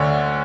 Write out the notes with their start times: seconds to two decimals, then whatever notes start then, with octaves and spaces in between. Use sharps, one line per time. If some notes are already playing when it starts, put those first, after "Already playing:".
Already playing: D2 D3 C#5